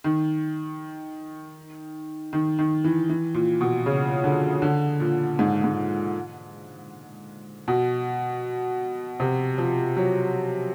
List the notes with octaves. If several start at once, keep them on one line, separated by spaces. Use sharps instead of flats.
D#3
D#3
D#3
E3
E3
A#2
B2
C#3
D3
D3
A#2
G#2
G#2
B2
C3
F3
F#3